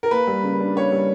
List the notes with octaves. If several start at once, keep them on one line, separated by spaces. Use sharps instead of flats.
A#4
A#3 B4
G3
C#3
D4
A#3 C#5
G3